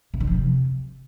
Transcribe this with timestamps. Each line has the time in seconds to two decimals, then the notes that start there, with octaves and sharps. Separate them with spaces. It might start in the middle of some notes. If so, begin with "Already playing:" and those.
0.14 C3
0.21 D3
0.27 F3
0.34 C3